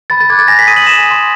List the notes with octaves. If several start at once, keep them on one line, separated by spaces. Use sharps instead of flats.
B5 A6
A6
D6 F#6 G#6
A6
G#5 A#6
B6
C6 D#6 D#7
F#7
G#5 E7
C6 D#6